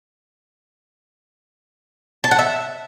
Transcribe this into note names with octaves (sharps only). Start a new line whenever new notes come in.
A5
F#5
E5